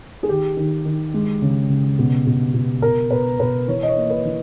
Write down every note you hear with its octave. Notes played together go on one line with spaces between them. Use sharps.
G#4
D#3 G4
D#3
D#3
G#3
C#3
C#3
B2
B2
B2
B2 A#4
B2 B4
B2 B4
E3 C#5
D#5
C#5
A#3
B4
E3